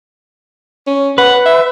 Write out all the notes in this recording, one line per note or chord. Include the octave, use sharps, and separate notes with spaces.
C#4
B4 F#5
E5